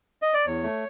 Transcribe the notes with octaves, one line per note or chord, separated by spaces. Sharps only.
D#5
D5
E2 C#5
A3